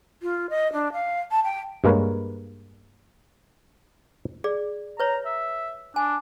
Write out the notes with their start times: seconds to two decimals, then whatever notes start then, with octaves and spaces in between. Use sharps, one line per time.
0.22 F4
0.50 D#5
0.72 D4
0.92 F5
1.31 A5
1.44 G5
1.84 G2 G#3 A#3 A#4 B4 C#5
4.44 G#4 D5
5.00 B4 C#5 A#5
5.26 E5
5.96 D4 G#5